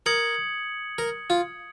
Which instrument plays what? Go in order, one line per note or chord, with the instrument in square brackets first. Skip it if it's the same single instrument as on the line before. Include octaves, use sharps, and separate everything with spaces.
[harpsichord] A#4 [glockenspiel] D#6 G#6 C#7 F#7
[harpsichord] A#4
F4